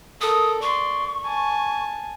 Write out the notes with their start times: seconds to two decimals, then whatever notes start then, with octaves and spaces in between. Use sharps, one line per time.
0.21 A4 A#4 D#6
0.62 D5 C6 C#6
1.26 G#5 A5